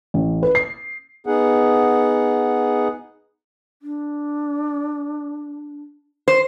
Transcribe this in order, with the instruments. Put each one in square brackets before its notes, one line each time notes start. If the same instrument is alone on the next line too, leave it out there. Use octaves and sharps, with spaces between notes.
[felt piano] A1
B4
C7
[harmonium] B3 D#4 G#4 F#5
[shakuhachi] D4
[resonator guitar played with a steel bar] C5